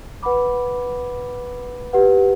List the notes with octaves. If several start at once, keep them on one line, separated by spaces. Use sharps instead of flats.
B4 F#5 B5 D6
G4 B4 F#5